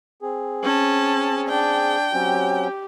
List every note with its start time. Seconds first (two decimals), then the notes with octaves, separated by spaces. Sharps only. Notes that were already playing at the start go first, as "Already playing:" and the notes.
0.22 C4 G#4
0.63 C#4 A5
1.48 D4 G5
2.13 F#3 C4 C#4 G4